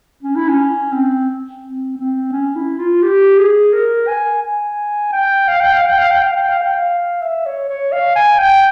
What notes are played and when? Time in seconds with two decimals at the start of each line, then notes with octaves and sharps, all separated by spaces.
0.23 C#4
0.36 E4
0.49 C#4
0.92 C4
1.62 C4
1.98 C4
2.32 C#4
2.56 E4
2.79 F4
3.02 G4
3.38 G#4
3.73 A#4
4.07 G#5
4.43 G#5
5.12 G5
5.48 F5
5.60 G5
5.73 F5
5.86 G5
5.98 F5
6.11 G5
6.23 F5
6.36 G5
6.48 F5
6.62 G5
6.74 F5
7.22 E5
7.46 C#5
7.69 C#5
7.92 F5
8.16 G#5
8.39 G5